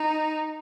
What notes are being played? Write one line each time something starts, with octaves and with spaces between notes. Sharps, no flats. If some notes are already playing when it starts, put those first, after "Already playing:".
Already playing: D#4